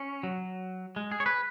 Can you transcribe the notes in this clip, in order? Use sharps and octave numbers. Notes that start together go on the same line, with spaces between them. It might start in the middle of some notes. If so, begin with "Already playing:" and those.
Already playing: C#4
F#3
G#3
G#4
C#5
B4